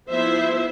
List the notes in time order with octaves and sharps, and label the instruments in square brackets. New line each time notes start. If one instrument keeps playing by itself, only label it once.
[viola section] F3 B3 E4 C5 E5